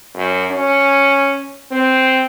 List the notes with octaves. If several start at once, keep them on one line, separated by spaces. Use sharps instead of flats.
F#2
C#4
C4